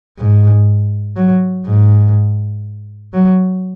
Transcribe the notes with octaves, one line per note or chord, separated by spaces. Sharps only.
G#2
F#3
G#2
F#3